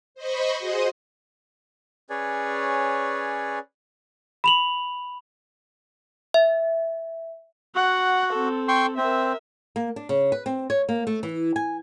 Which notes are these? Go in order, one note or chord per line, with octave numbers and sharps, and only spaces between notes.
C5 D#5 B5 C#6
F#4 G#4 C5 D#5 C6
C#4 G#4 B4 C#5 D5 G#5
B5 F7 F#7
E5
F#4 F#5
C4 A4
G5 C6 C#6
C4 A#4 E5
A#3
D4
C#3
B4
C4
C#5
A#3
A3
E3
G#5